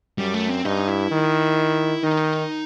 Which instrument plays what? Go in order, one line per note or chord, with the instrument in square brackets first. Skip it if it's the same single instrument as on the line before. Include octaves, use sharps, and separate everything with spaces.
[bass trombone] F#2 [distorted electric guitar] G3
[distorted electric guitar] A3
C4
[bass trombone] G2 [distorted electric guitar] D#4
[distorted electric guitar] E4
[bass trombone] D#3
[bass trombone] D#3 [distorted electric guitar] D#4